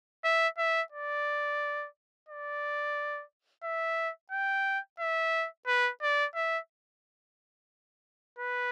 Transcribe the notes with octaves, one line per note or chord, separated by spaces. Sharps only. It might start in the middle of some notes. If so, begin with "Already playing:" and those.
E5
E5
D5
D5
E5
G5
E5
B4
D5
E5
B4